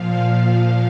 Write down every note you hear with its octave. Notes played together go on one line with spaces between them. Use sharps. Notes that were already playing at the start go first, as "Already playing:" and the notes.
Already playing: A#2 F3 F5
A#2 F3 F5